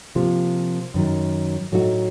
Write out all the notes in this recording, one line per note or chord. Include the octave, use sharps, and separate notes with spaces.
C3 F3 A#3 F4
F#2 D#3 F#3
A2 F#3 A3 D#4 F#4